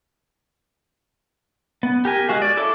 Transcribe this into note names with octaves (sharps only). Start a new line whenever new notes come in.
B3
G4 A#4 G#5
G#3 F#4 F5
D5
E4 A4 C#5 D6